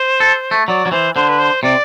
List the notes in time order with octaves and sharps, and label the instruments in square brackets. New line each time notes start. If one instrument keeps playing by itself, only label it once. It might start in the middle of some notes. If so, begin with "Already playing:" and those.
Already playing: [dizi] C5
[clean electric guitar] A4
A3
[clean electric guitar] F#3 [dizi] D5
[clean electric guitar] F#3
[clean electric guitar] E3 [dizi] C5
[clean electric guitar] D3 [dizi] C5
[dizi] B4
C5
[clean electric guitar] C3 [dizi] D5